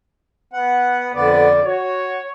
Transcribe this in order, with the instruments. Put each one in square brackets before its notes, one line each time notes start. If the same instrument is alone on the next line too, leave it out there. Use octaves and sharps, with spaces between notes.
[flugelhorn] B3 [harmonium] F#5
[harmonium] F2 D3 D5 [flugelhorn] B3
[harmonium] F#4 [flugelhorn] C#5